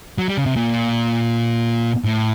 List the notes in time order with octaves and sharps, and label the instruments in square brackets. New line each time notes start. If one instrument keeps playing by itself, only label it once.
[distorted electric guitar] F#3
G3
C#3
C3
A#2
A2